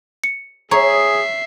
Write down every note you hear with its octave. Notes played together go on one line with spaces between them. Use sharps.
C#7
G#4 C#5 E5 A#5 C7